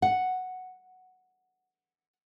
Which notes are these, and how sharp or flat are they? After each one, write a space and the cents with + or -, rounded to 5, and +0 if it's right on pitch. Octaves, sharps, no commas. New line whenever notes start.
F#5 +0